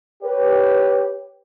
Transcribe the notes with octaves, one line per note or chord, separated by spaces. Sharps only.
G4 B4 C#5